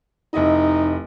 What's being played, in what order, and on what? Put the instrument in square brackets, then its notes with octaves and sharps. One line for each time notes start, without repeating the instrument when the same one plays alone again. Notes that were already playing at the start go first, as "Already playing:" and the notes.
[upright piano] F1 E4 D#5 [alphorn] D#4